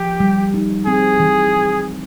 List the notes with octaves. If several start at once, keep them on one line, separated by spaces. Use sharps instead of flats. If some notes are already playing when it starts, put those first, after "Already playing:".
Already playing: F3 G4
G3
D#4
C4 G#4
E3